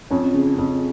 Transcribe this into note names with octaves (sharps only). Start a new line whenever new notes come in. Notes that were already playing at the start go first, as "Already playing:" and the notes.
F2 C#4
C#3
F2